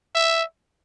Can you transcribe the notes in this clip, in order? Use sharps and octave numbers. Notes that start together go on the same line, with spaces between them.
E5